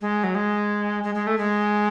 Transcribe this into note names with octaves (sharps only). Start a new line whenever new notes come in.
G#3
F#3
G#3
G#3
G#3
A3
G#3